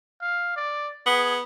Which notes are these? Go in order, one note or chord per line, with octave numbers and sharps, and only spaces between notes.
F5
D5
B3 G#4